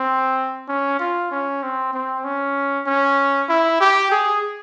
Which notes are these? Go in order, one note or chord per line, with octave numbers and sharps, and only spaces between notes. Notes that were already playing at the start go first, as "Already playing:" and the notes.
Already playing: C4
C#4
F4
C#4
C4
C4
C#4
C#4
E4
G4
G#4